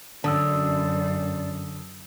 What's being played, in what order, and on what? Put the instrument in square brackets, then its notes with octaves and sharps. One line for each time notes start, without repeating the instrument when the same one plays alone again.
[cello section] F#2 [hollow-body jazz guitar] D3 [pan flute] D5 [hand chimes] A5 D#6 E6